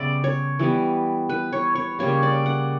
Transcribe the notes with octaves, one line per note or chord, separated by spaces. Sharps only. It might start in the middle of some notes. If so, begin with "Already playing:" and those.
Already playing: C#3 G3 B3 D5 E5
C#5
E3 G3 B3
B4
C#5
C#5
C#3 G3 A#3 C#5
D5
F#5